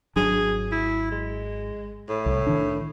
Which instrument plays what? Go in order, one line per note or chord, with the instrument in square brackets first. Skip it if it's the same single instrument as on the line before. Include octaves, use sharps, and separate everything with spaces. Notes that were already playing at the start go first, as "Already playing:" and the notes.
[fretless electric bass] G#1 F#3 D4 [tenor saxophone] G#4
[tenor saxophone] E4
G#3
A2
[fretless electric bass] C2
D#3 D4